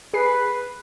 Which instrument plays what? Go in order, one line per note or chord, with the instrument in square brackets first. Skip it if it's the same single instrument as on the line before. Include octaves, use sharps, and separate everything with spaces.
[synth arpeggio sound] G#4 C7 [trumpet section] B4